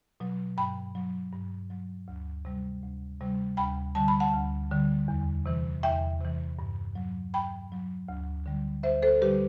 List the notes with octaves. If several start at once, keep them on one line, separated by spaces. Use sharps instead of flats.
B2 F#3
G2 G5 B5
F#3
G2
F#3
D2
C3 G3
D2
C3 G3
D2 G5 B5
D3 G3 A5
B5
F#5 A5
D2
D3 G3
E2
C3 E3
E2 E5 G5
C3 E3
G2
F#3
G2 G5 B5
F#3
D2
D3 G3
D2 C5 E5
A4 C5
D3 G3 G4 B4